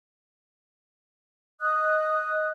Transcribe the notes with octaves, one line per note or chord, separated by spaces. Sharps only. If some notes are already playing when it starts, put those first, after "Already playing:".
D#5 D#6 F#6